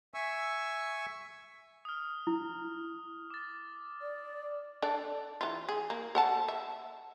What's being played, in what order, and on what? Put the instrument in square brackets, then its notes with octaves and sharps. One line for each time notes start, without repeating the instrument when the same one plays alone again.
[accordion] E5 G#5 C#6 E6
[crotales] D#6 F6
[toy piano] E4
[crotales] D6 A6
[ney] D5
[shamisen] D4 A4 D5
E3 F4
G#4
A#3
A4 F#5 A5
E5